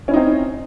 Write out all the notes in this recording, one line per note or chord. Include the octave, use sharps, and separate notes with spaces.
C4 C#4 D#4 E4